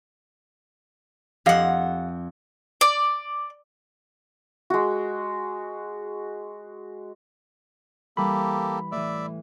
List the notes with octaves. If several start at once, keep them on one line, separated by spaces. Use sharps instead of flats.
F2 G4 D#5 F5 F#5
D5
G#3 F#4
E3 G3 A#3 G4 A4 B5
A2 E3 D5 E5